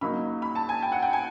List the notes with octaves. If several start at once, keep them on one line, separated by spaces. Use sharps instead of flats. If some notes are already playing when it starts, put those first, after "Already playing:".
C#3 F#3 A#3 D#4 B5
B5
A5
G#5
G5
F#5
G5
G#5